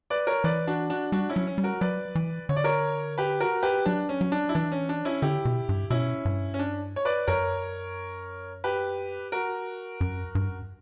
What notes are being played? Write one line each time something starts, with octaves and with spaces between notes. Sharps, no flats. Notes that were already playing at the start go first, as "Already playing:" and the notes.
B4 D5
A#4 C#5
E3 B4 D5
D4 F#4
D4 F#4
G3 D4 F#4
C#4 E4
F#3
C#4
G3
F#4 A#4
F#3 B4 D5
E3
D3 C#5
D5
A#4 C#5
G4 B4
F#4 A#4
G4 B4
F#3 D4
C#4
F#3
D4
E4
E3 D4
C#4
D4
C#4 E4
D3 E4 G4
B2
G2
B2 C#4 E4
G2
C#4
D4
C#5
B4 D5
F#2 A#4 C#5
G4 B4
F#4 A#4
F#2
G2
F#2